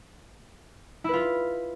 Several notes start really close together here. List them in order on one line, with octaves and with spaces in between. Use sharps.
E4 B4 F4